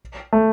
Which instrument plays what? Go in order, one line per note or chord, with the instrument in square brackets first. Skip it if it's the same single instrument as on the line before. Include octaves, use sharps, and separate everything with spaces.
[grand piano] A3